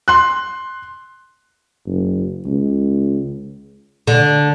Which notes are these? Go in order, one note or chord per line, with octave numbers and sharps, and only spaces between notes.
C6 F#6
F#1
C#2
D3